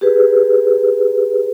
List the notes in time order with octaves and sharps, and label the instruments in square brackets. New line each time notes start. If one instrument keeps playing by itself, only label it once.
[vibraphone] G4 G#4 B4